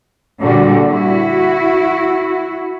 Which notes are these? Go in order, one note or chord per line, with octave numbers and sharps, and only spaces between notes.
A#2 D3 G3 F#4
E4 F#4